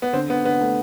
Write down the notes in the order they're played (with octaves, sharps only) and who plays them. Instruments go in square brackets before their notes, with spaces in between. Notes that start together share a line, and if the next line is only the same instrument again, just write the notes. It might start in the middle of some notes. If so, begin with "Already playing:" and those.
[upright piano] B3
[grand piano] D3 [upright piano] C4
[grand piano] D3 [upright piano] B3
[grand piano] D3 [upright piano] B3
[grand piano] A3